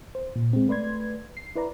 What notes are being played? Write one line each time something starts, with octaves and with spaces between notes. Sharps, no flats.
C5
A#2
G#3 C4
A3 B4 D5 C6 G#6
C7
E4 B4 D5 A#5